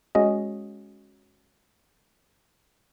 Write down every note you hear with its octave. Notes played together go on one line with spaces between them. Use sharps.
G#3 C#4 F#4 D#5